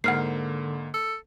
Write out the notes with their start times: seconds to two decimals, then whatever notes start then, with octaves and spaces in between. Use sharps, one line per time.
0.04 G#2 D3 A#3 F#5 F6 C7
0.94 A4